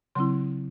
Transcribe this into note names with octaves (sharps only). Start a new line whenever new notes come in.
C#3 F#3 C4 E4 C6